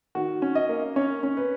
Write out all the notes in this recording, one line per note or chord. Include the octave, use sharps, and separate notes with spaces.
D#3 F#4
C#4
D#5
A#3
C#4 C#5
C#4
B4